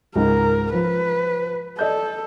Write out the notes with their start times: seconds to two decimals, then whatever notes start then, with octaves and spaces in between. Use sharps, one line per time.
0.16 C#2 G#2 A#4
0.74 F3 B4
1.79 A4 D5 D#5 G6